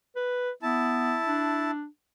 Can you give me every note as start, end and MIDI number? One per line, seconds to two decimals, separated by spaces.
0.16 0.51 71
0.63 1.17 59
0.63 1.71 64
0.63 1.71 81
1.27 1.85 62